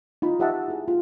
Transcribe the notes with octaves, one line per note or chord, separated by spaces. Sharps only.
D#4 F4 B5
G4 D#5 E5 F#5 A5
E4 G#4
F4